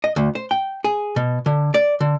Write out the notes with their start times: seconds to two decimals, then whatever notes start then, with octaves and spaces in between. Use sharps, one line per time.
0.04 D#5
0.16 D2
0.35 C5
0.51 G5
0.84 G#4
1.16 B2
1.46 D3
1.74 D5
2.00 D3